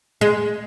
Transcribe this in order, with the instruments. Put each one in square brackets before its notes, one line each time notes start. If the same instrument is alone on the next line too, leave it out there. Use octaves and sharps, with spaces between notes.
[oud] G#3